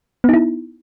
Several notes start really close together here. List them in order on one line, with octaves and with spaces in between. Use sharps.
B3 D#4 E4